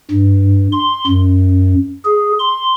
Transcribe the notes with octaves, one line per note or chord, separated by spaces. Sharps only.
G2
C6
F#2
G#4
C6